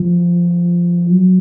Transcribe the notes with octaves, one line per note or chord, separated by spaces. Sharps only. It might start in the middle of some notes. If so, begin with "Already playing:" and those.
Already playing: F3
F#3